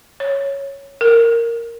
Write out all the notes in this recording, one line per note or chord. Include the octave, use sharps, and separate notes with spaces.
C#5
A#4